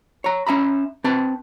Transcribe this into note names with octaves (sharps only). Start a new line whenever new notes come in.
C#5 A#5
C#4 E5 A#5 B5
C4 B4 A5